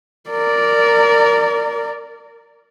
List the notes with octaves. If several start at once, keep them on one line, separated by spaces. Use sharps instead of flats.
A#4 D5